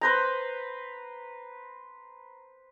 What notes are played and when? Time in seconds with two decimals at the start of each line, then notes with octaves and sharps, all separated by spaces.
0.01 B4 C5 A#5